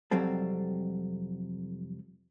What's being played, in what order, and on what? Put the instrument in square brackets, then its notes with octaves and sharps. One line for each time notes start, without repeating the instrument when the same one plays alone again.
[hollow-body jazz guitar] C2 F2 F#3 G3 C4 A4